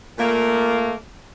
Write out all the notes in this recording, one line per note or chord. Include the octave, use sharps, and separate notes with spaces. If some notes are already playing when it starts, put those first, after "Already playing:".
A#2 A3 A#3